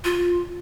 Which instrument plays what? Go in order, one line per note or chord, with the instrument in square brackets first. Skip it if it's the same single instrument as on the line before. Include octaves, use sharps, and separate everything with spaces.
[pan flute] F4